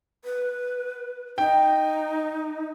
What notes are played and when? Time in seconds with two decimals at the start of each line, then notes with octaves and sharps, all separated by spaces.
0.24 B4
1.38 D#4 G5